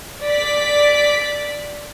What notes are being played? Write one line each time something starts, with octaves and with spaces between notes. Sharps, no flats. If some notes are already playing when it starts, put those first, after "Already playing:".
D5 B6